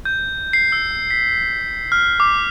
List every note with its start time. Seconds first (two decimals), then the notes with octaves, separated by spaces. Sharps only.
0.05 G6
0.53 C7
0.72 E6
1.10 B6
1.92 F6
2.20 D6